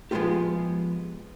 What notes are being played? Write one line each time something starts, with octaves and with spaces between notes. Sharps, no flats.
F3 G#3 B3 C4 F4 G4